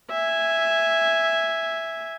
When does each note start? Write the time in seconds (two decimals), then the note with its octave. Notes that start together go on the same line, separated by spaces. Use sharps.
0.11 E5 G#5